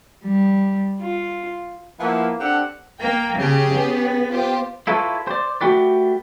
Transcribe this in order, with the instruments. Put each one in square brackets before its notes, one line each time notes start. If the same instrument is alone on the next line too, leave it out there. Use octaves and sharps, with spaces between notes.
[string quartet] G3
F4
[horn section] F3 A#3 B3 E4
C4 D4 G4 A4 F#5
[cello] A#3 [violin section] G5
[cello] C#3 [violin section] C#4 G4 G#4
[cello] B3
[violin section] F4 G4 C5
[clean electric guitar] E4 F4 A4 B4 C#5
C5 D5
A3 F#4 G4 B4 D5